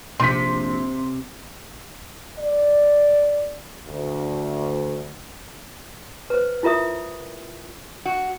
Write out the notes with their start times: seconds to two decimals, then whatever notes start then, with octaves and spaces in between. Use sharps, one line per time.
0.20 A#1 C3 C6 B6
2.39 D5
3.87 D2
6.30 B4 C5
6.63 E4 F4 A#4 E5 D#6
8.05 F#4